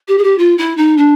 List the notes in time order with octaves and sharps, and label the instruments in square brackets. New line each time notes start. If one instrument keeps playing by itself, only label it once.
[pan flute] G4
G#4
G4
F4
E4
D#4
D4